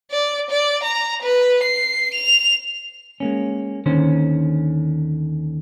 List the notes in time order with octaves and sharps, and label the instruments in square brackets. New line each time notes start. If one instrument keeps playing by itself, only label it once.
[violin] D5
D5
A#5
B4
C7
F7
[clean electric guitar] G#3 A#3 C#4
D#2 D3 D#3 C#4 C5